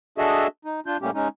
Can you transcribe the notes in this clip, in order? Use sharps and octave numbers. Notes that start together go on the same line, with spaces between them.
D4 F#4 G#4 A4 D#5 E5
D#4
D4 F4 G6
A2 G3 A3 A#3 C#4 G4
G#3 C#4 D#4